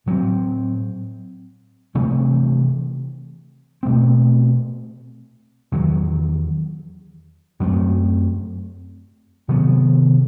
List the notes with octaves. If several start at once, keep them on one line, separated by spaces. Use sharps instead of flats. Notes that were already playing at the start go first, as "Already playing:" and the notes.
A2 F#3 C4
C3 E3 A3 C4
B2 A3 C4
E2 D#3 F#3
F#2 F#3 A3 C4
C3 D#3 F#3 B3